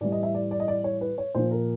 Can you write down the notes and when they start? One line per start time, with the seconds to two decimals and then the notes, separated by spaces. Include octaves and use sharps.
0.01 A2 E3 G3 D5
0.12 D#5
0.23 E5
0.35 D5
0.51 D5
0.60 D#5
0.68 D5
0.84 C#5
1.01 B4
1.18 C#5
1.35 A#2 F3 C5
1.51 A#4